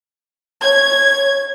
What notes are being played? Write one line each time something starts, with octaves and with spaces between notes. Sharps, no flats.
C#5 G#6